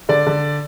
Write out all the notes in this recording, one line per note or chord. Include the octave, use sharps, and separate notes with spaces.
D3 D5
D3